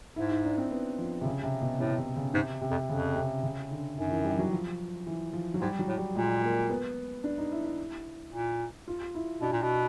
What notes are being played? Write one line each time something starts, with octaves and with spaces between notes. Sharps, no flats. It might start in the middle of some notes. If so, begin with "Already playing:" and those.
G#2 E4
D#4
D4
C4
B3
F3
C3
C#3
C3
B2
A2 C3
C3
C#3
G#2 C3
C3
F2
F2 C#3
C3
C#3
D3
F#2 D#3
E3
G3
F#3
F3
E3
F3
F#3
G#2 G3
F#3
A2
G3
A#2 G#3
A#3
B3
D4
D#4
E4
E4
A#2
F4
E4
B2 D4
A#2
B2